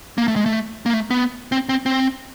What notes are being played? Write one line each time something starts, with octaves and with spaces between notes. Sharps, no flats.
A#3
A3
G#3
A3
A#3
A3
B3
C4
C4
C4